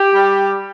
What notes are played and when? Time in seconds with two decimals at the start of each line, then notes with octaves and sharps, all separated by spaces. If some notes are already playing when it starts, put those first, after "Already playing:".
Already playing: G4
0.13 G3